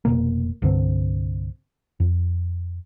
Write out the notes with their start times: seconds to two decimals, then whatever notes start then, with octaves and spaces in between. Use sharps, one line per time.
0.05 F1 D#2 B2 A#3
0.62 C2 G2 D3 C4
2.00 F2